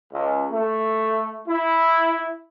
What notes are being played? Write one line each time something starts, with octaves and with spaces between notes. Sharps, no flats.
C#2
A3
E4